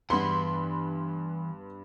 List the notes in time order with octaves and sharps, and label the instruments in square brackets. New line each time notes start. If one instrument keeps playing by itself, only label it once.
[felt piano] G2 B3 [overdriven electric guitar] E3 F#5 [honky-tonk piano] B5 C6